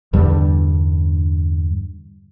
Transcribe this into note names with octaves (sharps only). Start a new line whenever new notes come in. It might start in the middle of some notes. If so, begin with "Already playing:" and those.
E2 G2 D3 G3